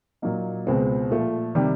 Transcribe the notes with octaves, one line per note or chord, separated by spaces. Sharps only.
A#2 F#3 A#3 D#4
C#2 B2 G#3 C4 F4
A#2 F3 A3
C3 D#3 G3